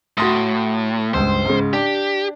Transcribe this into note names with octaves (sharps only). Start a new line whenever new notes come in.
A2 F#4 C6 D#6
C#2 G2 C5
G#2 C#3
D4 G4